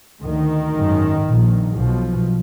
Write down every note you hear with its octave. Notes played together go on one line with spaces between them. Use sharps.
D2 D#3
G#1 F#2
A#1 A#2
B1 B2 F3